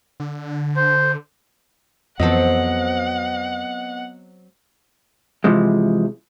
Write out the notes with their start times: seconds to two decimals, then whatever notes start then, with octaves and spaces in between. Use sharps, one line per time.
0.20 D3
0.76 C5
2.20 F2 E3 F#3 B3 C4 A4 D#5 F#5
5.44 C3 E3 F3 G#3